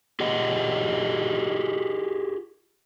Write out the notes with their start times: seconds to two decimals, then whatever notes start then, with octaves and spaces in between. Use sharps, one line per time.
0.20 F4 G4 G#4 D#5 F#5